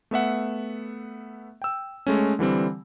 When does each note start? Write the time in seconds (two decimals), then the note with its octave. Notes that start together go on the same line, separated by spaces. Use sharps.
0.11 A3 B3 E5 F#5
1.62 G5 E6
2.07 G#3 A3 C#4
2.39 D3 E3 G3 C4